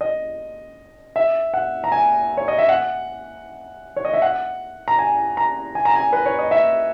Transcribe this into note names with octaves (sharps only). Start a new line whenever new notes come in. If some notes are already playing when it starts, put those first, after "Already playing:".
D#5
E5
F#5
A#5
G#5
C#5
D#5
E5
F#5
C#5
D#5
E5
F#5
A#5
G#5
A#5
G#5
A#5
G#5
B4
C#5
D#5
E5